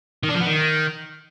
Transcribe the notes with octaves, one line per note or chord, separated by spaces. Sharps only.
D#3
D4
F3
B3
D#3